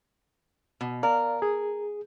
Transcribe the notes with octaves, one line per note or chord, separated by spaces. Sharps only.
B2
A#4 D5 F5
G#4